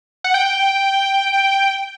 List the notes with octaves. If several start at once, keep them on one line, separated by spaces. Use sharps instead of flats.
F#5
G5